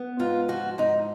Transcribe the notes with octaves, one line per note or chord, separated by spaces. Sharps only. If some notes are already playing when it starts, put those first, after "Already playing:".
Already playing: B3
G#2 F4
F3 F#4
G#2 D#4